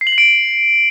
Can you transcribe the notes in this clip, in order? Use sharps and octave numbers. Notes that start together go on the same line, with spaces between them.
C7
F#7
C7
D7